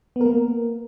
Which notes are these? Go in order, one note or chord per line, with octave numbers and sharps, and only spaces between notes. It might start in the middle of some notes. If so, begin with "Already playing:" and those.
A#3 B3 A#4